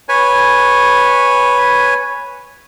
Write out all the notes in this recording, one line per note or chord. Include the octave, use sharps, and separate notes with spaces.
B4 C#5 G#5